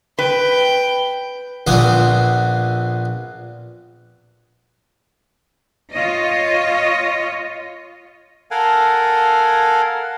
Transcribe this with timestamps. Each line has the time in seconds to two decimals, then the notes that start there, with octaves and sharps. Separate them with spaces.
0.19 B4 G5
1.67 A#1 B3 C4 F4 G#5 D#6
5.91 F4 C#5 D#5
8.51 A4 A#4 F5 F#5 G#5